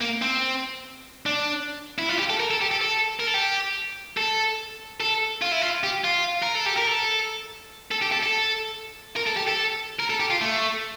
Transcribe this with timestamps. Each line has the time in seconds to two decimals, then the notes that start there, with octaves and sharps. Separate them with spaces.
0.01 A#3
0.22 C4
1.26 D4
1.99 E4
2.09 F4
2.19 G4
2.30 A4
2.40 A#4
2.51 A4
2.61 G4
2.71 A4
2.81 A4
3.19 A#4
3.27 A4
3.34 G4
4.17 A4
5.00 A4
5.42 F4
5.52 E4
5.61 F4
5.84 G4
6.04 F4
6.43 A#4
6.55 A4
6.66 G4
6.78 A#4
6.87 A4
7.91 A4
8.02 G4
8.12 A4
8.23 A4
9.16 A#4
9.27 A4
9.36 G4
9.47 A4
9.99 A#4
10.10 A4
10.20 G4
10.30 F4
10.41 A3